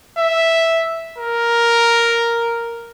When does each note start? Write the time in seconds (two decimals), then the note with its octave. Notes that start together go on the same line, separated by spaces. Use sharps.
0.18 E5
1.18 A#4